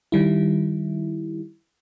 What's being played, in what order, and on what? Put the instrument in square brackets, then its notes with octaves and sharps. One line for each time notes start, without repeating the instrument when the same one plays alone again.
[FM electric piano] D#3 G3 E4